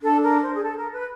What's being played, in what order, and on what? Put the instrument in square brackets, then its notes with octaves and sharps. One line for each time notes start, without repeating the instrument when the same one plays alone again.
[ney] D4 [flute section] A4
[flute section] A#4
C5
G#4
A4
A#4
B4